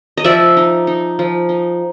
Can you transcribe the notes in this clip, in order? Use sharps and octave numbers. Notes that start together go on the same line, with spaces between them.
D#5
F3 D5 E5
D#4
D#4
F3
D#4